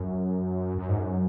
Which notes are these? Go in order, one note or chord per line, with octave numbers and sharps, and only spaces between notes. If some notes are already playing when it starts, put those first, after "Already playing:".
Already playing: F#2
F#2
G#2
F#2